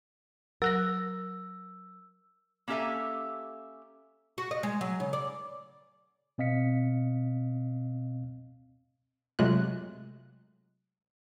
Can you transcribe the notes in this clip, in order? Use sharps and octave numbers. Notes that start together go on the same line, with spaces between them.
F#3 A#4 E6 F#6 A#6
A#3 C#4 G4 A4 E5 G#5
F#4
D#5
G#3
F#3
C#3
D5
B2 C4 D#5 F5 B6 C#7
C3 F#3 G#3 A3 F4 F#6